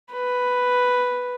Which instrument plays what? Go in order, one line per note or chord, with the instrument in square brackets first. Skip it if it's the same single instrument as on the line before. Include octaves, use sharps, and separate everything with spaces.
[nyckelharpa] B4